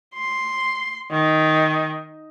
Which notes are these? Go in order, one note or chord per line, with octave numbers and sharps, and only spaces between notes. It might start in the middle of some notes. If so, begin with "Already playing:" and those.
C6
D#3